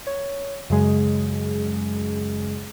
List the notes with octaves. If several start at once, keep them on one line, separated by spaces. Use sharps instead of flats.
C#5
F#2 C#3 F#3 G#3 G#4